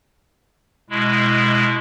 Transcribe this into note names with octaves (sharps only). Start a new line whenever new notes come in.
B2 G#3 E4